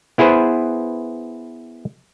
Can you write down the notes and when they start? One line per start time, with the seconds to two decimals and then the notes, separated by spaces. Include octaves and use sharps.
0.18 B3 E4 G#4 B4 C5